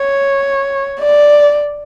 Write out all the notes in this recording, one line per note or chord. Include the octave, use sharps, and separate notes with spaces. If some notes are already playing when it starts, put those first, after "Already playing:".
Already playing: C#5
D5